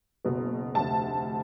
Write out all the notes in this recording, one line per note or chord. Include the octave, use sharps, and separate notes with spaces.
F#1 B2
F1 D2 A5